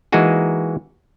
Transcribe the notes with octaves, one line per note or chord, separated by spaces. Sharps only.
E3 G#3 A#3 D#4 F#4 G#4